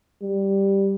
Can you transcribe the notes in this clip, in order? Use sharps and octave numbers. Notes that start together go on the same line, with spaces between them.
G3